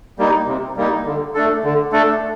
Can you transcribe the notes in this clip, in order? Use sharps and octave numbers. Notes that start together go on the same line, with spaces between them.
G3 A#3 D#4
C3
G3 A#3 D#4
D3
A3 D4 A4
D3
A3 D4 A4